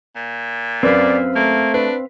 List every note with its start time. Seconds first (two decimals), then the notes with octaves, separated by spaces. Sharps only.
0.16 A#2
0.83 F#2 C4 A#4 B4 D5 F5
1.36 A3 A#3
1.74 D4 B4